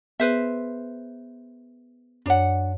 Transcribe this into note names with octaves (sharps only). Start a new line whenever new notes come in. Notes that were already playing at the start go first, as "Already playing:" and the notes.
B3 G#4 B4 C5 E5
F#2 D4 C#5 F#5